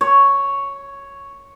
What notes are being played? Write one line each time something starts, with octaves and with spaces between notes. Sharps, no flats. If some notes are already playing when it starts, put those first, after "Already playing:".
C#5